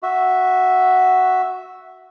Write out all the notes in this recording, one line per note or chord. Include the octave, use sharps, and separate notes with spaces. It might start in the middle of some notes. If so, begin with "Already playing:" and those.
F#4 E5